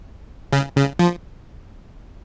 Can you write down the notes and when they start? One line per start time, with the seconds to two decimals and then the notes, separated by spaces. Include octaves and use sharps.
0.53 C#3
0.76 C#3
0.99 F3